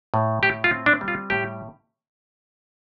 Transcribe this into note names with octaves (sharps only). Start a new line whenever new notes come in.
A2
A2 G4
F4
C4
D4
G3
F4
A2 G4